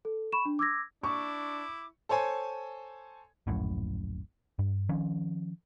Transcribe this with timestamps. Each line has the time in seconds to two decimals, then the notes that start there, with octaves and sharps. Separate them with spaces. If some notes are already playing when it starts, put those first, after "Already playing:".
0.05 A4
0.32 B5 C#6 E7
0.45 D4
0.59 D6 E6 G#6 A#6
1.03 D4 E4 C#6 D6
2.09 A4 C5 C#5 G#5
3.47 D1 A#1 F#2 A2
4.59 G2
4.89 D#3 F3 C#4